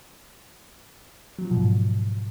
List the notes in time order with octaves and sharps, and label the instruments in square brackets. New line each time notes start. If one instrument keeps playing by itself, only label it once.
[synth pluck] F#3
F3
B2
G#2